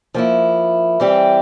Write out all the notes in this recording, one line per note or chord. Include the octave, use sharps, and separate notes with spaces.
F3 A#3 E4
E3 G3 C4 G4